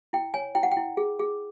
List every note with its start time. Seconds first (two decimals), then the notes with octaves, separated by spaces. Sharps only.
0.13 E4 G5
0.34 C#5 G#5
0.55 E4 G5
0.63 F#5
0.72 G5
0.77 E4
0.97 G#4
1.19 G#4